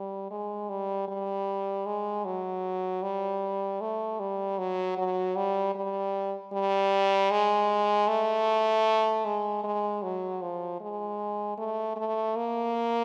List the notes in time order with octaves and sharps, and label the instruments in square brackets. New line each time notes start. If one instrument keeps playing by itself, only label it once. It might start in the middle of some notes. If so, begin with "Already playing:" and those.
Already playing: [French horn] G3
G#3
G3
G3
G#3
F#3
G3
A3
G3
F#3
F#3
G3
G3
G3
G#3
A3
G#3
G#3
F#3
F3
G#3
A3
A3
A#3